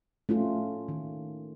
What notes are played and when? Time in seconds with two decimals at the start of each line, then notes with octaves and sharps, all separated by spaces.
0.29 A3 C#4 F4
0.88 D#3